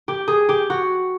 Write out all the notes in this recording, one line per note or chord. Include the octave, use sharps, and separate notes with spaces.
G4
G#4
G4
F#4